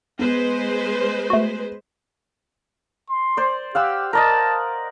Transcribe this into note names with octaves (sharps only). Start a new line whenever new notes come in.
G#3 B3 B4 C5
A3 F#4
C6
C5 D5
G4 F5 F#5 E6
A#4 D5 D#5 A5